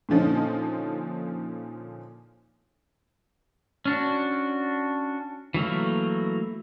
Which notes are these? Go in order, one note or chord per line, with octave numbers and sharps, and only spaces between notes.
A#2 D3 F3 C#4 D#4
C#4 D4 F#4
E3 F#3 A3 A#3